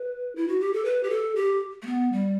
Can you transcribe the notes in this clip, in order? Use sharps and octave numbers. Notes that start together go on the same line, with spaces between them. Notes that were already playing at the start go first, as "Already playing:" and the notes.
Already playing: B4
E4
F#4
G4
A4
B4
G4
A4
G4
A3
B3
G3